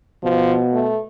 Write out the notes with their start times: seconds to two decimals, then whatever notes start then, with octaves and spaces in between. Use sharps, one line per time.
0.23 B2 F3
0.73 A3